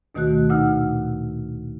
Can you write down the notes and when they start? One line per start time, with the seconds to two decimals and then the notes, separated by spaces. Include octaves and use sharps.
0.15 D2 B2 D#3 A3 F#4 F#6
0.50 A#2 D#4 F#5 E6 F6